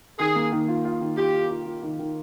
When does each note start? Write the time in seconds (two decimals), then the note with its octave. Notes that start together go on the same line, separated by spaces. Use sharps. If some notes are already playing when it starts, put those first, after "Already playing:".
0.19 D#3 G#4
0.35 A#3
0.52 D#3
0.68 F4
0.85 F4
1.01 D#3
1.17 F4 G4
1.34 F4
1.50 F4
1.67 F4
1.83 D#3
1.99 D#3